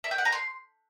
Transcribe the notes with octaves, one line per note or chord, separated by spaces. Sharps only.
E5
G5
F#5
A#5
C6